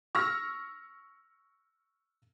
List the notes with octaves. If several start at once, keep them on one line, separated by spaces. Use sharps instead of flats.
C#6 E6 F6 A#6